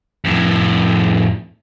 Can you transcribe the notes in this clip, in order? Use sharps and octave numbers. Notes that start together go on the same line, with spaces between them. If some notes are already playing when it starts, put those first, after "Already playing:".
F2 A2